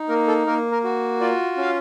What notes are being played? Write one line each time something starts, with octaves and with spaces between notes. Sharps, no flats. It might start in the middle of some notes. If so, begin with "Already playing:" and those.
Already playing: D#4
A#3 A#4
A4
A#3 A#4
A#4
F#4
F4 D5
C#4 F5